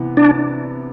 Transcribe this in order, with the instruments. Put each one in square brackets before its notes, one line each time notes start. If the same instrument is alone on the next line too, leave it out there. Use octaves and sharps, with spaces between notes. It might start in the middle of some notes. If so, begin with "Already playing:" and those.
Already playing: [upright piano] C3 E3 B3
[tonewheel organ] D4